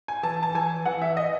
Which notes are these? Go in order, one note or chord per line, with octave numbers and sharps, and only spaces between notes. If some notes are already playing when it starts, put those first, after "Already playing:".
G#5
E3 A5
A5
E3 G#5
E3 F#5
E5
D#5